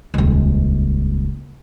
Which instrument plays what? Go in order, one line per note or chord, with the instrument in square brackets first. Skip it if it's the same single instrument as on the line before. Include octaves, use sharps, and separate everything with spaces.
[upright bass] D#1 C#2